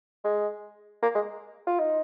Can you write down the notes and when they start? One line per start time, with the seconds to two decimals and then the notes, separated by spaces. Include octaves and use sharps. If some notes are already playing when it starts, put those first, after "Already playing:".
0.24 G#3
1.03 A#3
1.15 G#3
1.67 F4
1.79 D#4